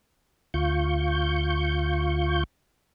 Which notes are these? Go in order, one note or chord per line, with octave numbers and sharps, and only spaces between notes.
D2 F4 C#6 G6